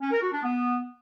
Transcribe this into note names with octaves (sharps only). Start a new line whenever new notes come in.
C#4
A#4
F#4
D4
B3